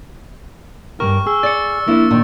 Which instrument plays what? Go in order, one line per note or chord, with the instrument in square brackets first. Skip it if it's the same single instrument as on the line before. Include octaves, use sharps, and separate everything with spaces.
[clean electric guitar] G2 A#2 A#4 [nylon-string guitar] G4 [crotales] C#6 F6
[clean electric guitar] G#4 [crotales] E6
[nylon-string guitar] D5 [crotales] A6 C#7
[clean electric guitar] A#3 D4 [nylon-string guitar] E4
[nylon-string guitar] A#2 D#3